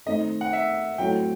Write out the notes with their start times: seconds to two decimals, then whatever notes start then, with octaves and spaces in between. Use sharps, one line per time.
0.06 D#3 A3 C4 D#5
0.41 F#5
0.53 E5
0.98 A2 F#3 C4 E4 A4 G5